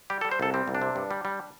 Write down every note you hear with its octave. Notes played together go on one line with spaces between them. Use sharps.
G3 G4
A4
G3
C5
C2 A4
G3 C4
C2
D4
C3
G2
G3
G3